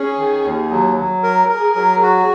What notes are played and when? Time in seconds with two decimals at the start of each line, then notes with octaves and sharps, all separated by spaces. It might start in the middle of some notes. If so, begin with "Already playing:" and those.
Already playing: C#4 G#4
0.18 D#3
0.44 D#2
0.71 F#3
0.96 F#3
1.23 A#4
1.49 G#4 A#4
1.76 F#3
1.89 G#4
2.02 F#4